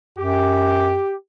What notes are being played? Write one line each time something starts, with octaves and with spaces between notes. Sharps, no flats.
F#2 G4